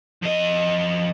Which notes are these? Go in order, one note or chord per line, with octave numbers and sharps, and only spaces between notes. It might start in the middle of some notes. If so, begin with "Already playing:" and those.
F2 D#5